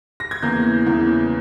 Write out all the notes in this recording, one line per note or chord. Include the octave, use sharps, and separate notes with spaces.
A#6
G#6
E2 C#3 E3 A#3 G6
E2 C#3 E3 A#3